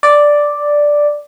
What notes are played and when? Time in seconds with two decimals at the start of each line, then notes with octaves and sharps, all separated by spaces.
0.03 D5